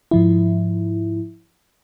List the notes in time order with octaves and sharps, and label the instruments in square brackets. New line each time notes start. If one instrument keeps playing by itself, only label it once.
[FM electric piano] G#2 F3 E4